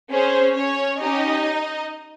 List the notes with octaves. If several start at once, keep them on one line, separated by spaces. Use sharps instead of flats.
C#4 G#4 C5
C#4 C#5
C#4 D#4 G4 D#5